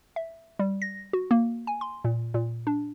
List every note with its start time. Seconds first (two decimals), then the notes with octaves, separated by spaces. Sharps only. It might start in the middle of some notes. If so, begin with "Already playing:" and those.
0.16 E5
0.59 G3
0.82 A#6
1.13 F#4
1.31 A#3
1.67 G#5
1.81 C6
2.04 A#2
2.34 A#2
2.67 D4